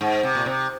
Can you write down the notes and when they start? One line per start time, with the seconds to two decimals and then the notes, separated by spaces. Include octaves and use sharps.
0.01 G#2
0.23 C3
0.35 A#2
0.46 C3